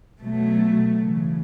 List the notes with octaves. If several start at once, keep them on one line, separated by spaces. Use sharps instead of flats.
B2 F#3 A3
C#3 E3